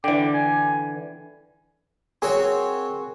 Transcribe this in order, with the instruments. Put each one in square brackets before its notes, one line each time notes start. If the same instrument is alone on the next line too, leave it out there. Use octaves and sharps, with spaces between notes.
[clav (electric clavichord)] D3 E3 [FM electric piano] D5 G5 [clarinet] D6
[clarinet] G#5
[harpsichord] C4 F#4 C#5 [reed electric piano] G#4 A#4 G#5